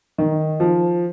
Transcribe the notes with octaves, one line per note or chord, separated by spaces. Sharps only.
D#3
F3